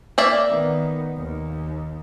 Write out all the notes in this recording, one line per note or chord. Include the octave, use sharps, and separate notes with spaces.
A#3 D5 E5
D#3 B3
D#2